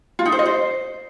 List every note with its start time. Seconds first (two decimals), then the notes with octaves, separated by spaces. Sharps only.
0.19 F4
0.26 D#4
0.32 C5
0.39 D#5
0.46 C5